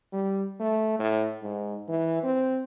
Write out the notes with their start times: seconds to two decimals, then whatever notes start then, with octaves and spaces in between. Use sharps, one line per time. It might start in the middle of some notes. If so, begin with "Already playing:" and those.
0.12 G3
0.60 A3
0.99 A2
1.43 G#2
1.88 E3
2.23 C4